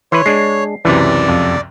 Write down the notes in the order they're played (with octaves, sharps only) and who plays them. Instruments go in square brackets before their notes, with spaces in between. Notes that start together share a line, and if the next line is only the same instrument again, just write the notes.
[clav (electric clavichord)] E3 B4 [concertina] C#5 [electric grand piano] C6
[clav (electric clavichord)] G#3 D4 [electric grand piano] C7
[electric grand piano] C#2 F#2 C3 [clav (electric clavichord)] E3 [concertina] D5
[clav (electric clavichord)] F2